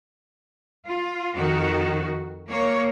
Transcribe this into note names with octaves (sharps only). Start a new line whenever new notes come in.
F4
F2 D#3 F#4
A#3 C#5